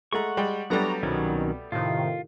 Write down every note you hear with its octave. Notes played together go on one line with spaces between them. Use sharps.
G#3 A3 F#5 A#5 C#6
G3 G#3 G5
F#3 G3 A3 B3 D4 A#5
C2 B2 D#3 F#3 C#4
A2 C3 D#3 F4